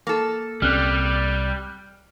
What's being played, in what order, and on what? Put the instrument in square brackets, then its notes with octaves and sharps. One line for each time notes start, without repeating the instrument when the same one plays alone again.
[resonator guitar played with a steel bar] A#3 A4
[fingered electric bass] C2 C4 C#4 [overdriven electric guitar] G3 [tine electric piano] F6 F#6